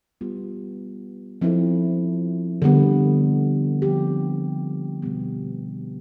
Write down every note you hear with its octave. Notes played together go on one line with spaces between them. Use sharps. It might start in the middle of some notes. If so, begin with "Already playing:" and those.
G3 B3 F4
F3 C4 E4 A4
D3 G3 B3
F3 C4 G4
B2 G3 B3